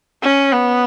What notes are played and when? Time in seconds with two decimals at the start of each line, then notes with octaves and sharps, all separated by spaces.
0.23 C#4
0.53 B3